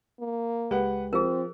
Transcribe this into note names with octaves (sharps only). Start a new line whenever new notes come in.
A#3
C#2 G#3 G4 B4 F#5
F3 C4 G#4 A#4